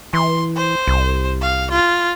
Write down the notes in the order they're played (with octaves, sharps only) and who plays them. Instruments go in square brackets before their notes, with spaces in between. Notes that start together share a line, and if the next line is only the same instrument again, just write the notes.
[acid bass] E3 [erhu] C6
[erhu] C5
[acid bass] C2
[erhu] F5
F4